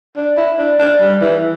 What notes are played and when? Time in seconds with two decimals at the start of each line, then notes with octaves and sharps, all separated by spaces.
0.17 D4
0.37 E4
0.58 D4
0.79 D4
1.00 G3
1.21 E3